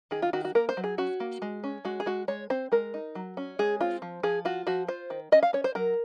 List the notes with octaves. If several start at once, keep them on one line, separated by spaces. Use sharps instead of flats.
D#3 G#4
F4
D#3 F#4
F#4
A#3 A#4
C5
F#3
G#4
C#4 F#4
A#3
G#3
C#4
G#3 F#4
G#4
G#3 F#4
G#3 C#5
C4 C5
G#3 A#4
D#4
F#3
C#4
G#3 G#4
C4 F4
F3
F3 G#4
F4 F#4
F3 F#4
F4 C5
D#3
C#4 D#5
F5
C#4 C#5
C5
F#3 A#4